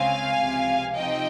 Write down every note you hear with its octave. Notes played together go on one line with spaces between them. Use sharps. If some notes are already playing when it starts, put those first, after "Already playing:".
Already playing: C#2 C#3 G#3 C4 F5 G#5
C#2 C3 F3
C3 F3 C4 D#4 D#5 G5